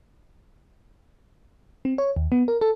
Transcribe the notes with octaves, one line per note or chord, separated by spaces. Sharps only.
C4
C#5
D#2
B3
A#4
A4